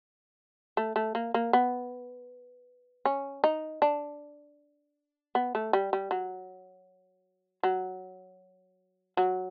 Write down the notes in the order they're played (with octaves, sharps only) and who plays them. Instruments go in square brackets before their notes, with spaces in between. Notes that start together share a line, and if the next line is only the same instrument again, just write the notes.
[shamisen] A3
A3
A#3
A#3
B3
C#4
D#4
D4
B3
A3
G3
G3
F#3
F#3
F#3